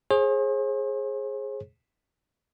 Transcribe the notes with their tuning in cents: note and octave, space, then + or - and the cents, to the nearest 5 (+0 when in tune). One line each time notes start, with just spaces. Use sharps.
G#4 +5 C5 +45